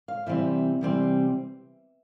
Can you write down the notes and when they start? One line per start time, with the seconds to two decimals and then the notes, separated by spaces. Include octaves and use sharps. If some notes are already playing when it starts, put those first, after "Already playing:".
0.08 F5
0.26 C3 E3 G3 C4 E5
0.81 C3 E3 G3 C4